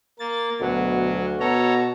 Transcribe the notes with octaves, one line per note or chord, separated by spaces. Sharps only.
A#3 A6
D2 B2 F#3
B2 A4 C#5 A#5